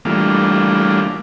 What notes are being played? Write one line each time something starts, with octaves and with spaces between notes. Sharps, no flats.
E3 G3 A3 A#3 D4 F4